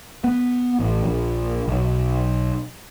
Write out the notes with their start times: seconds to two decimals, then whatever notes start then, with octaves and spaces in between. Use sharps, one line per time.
0.24 B3
0.80 A1
1.04 A#1
1.68 B1